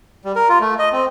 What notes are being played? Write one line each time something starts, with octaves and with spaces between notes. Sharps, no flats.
G3
A#4
F4
A3
D#5
C4